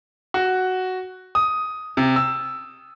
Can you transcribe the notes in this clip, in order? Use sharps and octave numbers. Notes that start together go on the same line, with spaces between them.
F#4
D#6
C3
E6